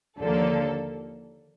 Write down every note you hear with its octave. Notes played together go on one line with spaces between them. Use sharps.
D#2 D3 F3 A#3 A4